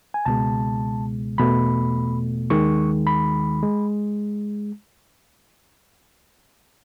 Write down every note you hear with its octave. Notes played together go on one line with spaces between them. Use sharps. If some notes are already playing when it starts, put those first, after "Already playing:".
G#5
C#2 B2 G#3 A5
E2 B2 A3 B5
D#2 D#3 G#3 C#6
B5
G#3